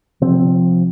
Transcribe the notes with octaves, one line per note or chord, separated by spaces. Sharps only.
C3 F3 C4